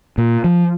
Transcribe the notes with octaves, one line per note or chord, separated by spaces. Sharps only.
A#2
F3